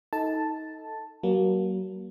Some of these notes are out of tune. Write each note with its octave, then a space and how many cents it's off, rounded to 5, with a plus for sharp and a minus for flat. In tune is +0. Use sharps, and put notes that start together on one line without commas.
D#4 +25 A4 +5 A5 +0
F#3 +30 A#3 +20